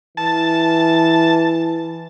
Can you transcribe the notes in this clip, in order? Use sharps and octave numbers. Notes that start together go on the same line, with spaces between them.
E3 A5